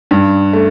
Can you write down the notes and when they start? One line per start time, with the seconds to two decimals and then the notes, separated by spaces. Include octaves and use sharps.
0.11 G2
0.53 A3